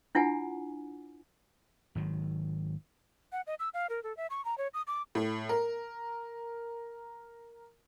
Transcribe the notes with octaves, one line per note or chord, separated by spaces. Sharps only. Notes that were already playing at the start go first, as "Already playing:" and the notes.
D4 E4 F4 F#5 G#5
G#1 D#3 F#3
F#5
D#5
E6
F5
A#4
A4
E5
C#6
A#5
C#5
D#6
D6
A2
A#4